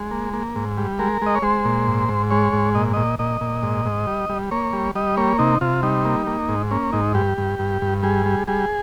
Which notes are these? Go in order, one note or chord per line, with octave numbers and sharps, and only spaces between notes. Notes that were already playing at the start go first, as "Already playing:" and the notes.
Already playing: G#3
A#3
A#3
G#2
G3
G#3 A#4
G#3 D#5
C#5
G#3 C5
A#2
G#2
G#2
G#3 C#5
G#2
A#2 D#5
A#2 D#5
A#2 D#5
A#2
G#2
G#2
G3
G3
A#3 C#5
G3
G3 D#5
A#3 C#5
C3 D#4
C3 F4
G3 D#4
A#3
A#3
G#2
A#3 C#4
G#2 D#4
G2 G4
G2
G2
G2
G3 G#4
G3
G3 G#4